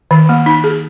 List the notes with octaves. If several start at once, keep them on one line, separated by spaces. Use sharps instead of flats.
D#3
A#3
D#4
G#4